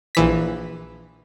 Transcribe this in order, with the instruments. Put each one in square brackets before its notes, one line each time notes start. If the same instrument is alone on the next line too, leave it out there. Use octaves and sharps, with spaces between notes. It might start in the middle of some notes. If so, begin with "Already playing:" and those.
[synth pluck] A#1 E3 B6